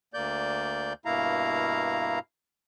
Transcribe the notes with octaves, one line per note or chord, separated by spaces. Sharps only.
D2 A#3 D5 G6
G2 B2 A#3 E4 F5 A#5